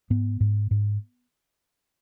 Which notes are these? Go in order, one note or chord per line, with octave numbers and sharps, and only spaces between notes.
G#2 B3
G#2
G#2